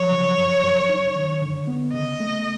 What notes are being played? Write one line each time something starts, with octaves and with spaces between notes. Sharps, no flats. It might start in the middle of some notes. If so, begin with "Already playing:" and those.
Already playing: F3 F#3 C#5
C#3
F#2
F#2
D#4
D#3
D3
B3
C#3 D#5
A3